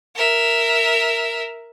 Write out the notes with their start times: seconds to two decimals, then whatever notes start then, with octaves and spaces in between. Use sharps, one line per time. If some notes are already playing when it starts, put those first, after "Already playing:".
0.16 A#4 E5